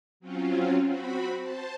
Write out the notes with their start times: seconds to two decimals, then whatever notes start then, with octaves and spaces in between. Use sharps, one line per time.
0.20 F#3 C4 C#4 F4
0.86 C4 F#4 B5
1.39 C5 A5